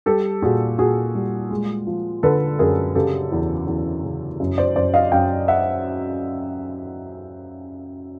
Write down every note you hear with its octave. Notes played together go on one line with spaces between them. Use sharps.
G3 G4 A4
A#2 F#4 G#4
A#2 F#4 G#4
G3
G#3
F3
D3 A4 B4
F#2 G#4 A#4
C#3 G4 A4
E2
E2
C#3
F#2
C5 D5
F#2 C5 D5
D#5 F5
F#2 F5 G5
E5 F#5